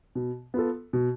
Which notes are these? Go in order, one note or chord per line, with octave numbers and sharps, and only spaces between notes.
B2
B3 F4 A4
B2